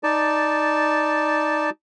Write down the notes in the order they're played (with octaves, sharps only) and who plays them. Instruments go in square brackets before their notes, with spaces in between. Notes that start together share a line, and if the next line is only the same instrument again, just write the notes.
[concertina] D#4 D5 A5